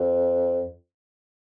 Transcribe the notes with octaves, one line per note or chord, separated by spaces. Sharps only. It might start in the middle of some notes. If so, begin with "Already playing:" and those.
Already playing: F2